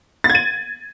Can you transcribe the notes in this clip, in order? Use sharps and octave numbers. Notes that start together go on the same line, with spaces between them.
A6
G#6
D#7